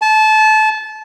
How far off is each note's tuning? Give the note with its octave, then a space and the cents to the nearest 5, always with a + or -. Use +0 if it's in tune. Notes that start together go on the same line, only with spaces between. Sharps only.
A5 -25